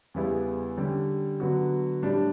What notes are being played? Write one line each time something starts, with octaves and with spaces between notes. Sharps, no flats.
E2 C#3 G3 B3 E4
D3 G3 C#4 G4
D3 F#3 B3 F#4
A2 G3 D4